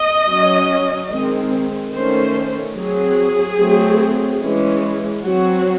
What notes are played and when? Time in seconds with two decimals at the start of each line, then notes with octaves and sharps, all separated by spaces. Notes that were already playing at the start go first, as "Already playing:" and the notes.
Already playing: D#5
0.27 F#3 C#4
1.10 D#3 G#3 C4
1.92 D#3 A3 C#4 C5
2.76 F#3 C4 G#4
3.58 F#3 A3 C4
4.42 E3 G#3 C#4
5.24 F#3 C4 F#4